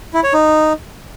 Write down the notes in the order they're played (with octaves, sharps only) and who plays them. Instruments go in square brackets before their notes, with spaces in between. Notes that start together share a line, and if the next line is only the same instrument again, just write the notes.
[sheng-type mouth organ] E4
C#5
D#4